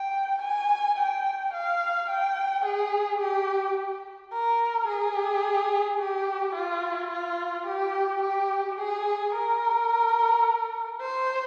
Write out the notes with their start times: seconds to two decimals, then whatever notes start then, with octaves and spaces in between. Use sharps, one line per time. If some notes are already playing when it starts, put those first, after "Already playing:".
Already playing: G5
0.42 G#5
0.98 G5
1.53 F5
2.09 G5
2.65 G#4
3.20 G4
4.32 A#4
4.87 G#4
5.99 G4
6.55 F4
7.11 F4
7.67 G4
8.22 G4
8.78 G#4
9.34 A#4
11.01 C5